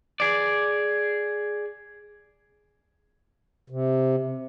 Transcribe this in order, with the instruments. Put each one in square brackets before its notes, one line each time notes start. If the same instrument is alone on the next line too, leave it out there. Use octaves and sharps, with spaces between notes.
[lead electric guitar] G#4 D5
[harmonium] C3